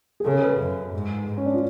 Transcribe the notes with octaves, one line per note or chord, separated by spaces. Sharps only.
G#4
C#3 A4
B4
F#2
G#2
G#2
C#4
D4
F4